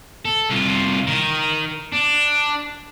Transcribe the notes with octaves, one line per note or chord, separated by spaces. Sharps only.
A4
C2 F4
D#3 A#4
D4